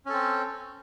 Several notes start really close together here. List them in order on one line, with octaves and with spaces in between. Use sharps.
C#4 A4 C4